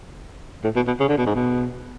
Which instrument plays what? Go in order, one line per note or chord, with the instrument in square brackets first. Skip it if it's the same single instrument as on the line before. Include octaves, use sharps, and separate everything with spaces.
[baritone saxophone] A2
B2
B2
C#3
D3
B2
G#2
B2